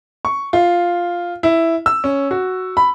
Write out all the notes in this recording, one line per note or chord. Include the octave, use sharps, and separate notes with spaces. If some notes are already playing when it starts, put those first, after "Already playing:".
C#6
F4
E4
E6
C#4
F#4
B5